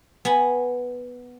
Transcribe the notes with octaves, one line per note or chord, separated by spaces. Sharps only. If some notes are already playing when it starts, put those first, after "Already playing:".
B3 G#5 B5